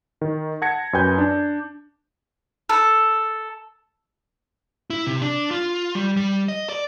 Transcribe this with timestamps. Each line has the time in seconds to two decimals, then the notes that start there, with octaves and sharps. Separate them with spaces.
0.21 D#3
0.62 F#5 A5 G#6 A#6 C#7
0.93 F#2 B4 G5 G#5 G6
1.18 D4
2.69 A4
4.90 E4
5.07 C3
5.21 D4
5.51 F4
5.95 G3
6.17 G3
6.48 D#5
6.69 D5